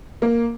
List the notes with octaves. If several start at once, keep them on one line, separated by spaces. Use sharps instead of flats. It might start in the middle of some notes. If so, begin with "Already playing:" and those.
A#3